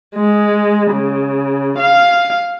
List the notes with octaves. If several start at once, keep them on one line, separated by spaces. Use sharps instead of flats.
G#3
C#3
F5